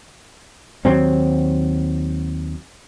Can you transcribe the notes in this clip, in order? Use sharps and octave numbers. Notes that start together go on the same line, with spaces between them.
D#2 F#3 C4